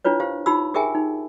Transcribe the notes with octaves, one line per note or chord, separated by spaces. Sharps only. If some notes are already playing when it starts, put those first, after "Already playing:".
D4 E4 F4 B4 C#5
G4 C5 F5
D#4 F4 G4 B5 E6
G4 G#4 A#4 E5 G5 G#5
D#4